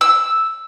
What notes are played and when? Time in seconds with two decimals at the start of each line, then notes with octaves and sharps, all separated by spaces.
0.01 E6